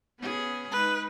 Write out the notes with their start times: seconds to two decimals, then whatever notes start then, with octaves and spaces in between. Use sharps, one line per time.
0.19 B3 C#4 G#4
0.72 G#3 D#4 B4